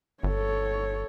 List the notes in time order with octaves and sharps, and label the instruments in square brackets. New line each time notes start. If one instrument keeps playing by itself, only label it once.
[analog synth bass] G1 [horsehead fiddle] A4 C#5